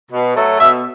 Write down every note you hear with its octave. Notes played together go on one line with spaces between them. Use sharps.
B2
F#3 A3
B2 E5